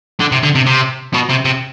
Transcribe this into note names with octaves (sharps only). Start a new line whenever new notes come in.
D3
C3
D3
C3
C3
B2
C3
C3